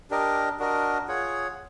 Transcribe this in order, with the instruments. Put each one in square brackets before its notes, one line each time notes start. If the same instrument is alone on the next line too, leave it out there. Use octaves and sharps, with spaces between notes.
[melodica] D4 G4 A#4 D#5
D4 F#4 A#4 D#5
F4 G#4 C#5 F#5